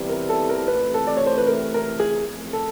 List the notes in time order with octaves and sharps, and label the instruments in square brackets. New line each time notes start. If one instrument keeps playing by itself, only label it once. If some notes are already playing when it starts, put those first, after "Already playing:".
Already playing: [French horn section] C3 E3 G3 B3 E4
[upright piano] A#4
A4
A#4
[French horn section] C3 E3 A3 C4 [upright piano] B4
[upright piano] A4
D5
C#5
C5
B4
A#4
A#4
G#4
[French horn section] A2 F3 A3 C4
[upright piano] A4